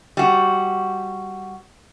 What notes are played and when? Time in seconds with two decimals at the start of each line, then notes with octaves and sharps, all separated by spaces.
0.17 G3 F#4